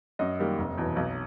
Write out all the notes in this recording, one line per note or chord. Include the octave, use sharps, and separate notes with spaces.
F#2 D#5
D#3 G3 A#3
F1
E2 B2
B1